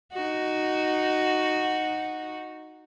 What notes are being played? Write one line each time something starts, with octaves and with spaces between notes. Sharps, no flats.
D#4 F#4